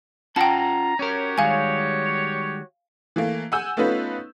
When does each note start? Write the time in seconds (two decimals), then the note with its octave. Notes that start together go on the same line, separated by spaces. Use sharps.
0.36 C#4 F4 F#5 G5 A5 A#5
0.99 C#4 F#4 G4 A#4 C#5
1.38 D#3 G3 G#3 F5 G#5
3.16 E3 A3 A#3
3.52 F#5 G#5 E6 G6
3.77 A3 B3 C#4 D#4 F4 B4